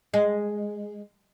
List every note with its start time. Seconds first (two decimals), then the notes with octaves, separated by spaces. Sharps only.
0.14 G#3